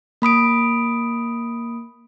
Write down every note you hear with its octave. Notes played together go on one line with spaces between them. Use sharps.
A#3 B5 D#6 D7